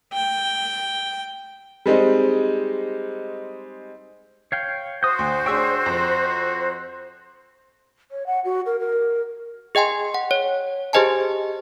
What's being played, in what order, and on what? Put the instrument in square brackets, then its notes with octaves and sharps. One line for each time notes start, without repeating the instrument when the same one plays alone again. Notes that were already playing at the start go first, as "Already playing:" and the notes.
[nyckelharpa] G5
[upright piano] G3 G#3 C4 D#4
[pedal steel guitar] C#5 F5 G5
[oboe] F#4 [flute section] C5 [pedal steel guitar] D#6 G6
[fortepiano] D2 [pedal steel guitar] C6
[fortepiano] D4 G#4 C#5 [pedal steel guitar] G5 E6
[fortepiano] F2
[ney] C#5
F#5
F#4
A#4
A#4
[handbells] G#4 D#5 G5 G#5 C6
F#5
C#5
G4 G#4 C5 D#5 G#5 A5